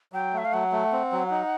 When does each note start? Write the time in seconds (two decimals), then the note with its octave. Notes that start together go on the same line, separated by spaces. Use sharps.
0.13 F#3 G5
0.33 A3 E5
0.45 F5
0.53 F#3 F#5
0.72 A3
0.92 C4
1.12 F#3
1.31 D#4